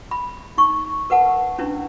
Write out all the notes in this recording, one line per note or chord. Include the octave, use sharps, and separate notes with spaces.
B5
D#4 C#6
A#4 B4 F#5 A5
C#4 D4 E4 B4